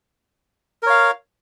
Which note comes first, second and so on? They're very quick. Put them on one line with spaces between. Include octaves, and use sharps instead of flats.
A#4 C#5 F5